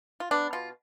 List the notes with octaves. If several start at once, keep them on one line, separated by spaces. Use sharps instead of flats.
F4
B3 D4
B2 F4